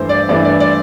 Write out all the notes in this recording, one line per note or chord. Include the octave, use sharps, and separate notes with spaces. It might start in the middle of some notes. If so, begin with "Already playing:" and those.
Already playing: G2 E3 A3 C5
D5
G2 E3 A3 D5
D5
D5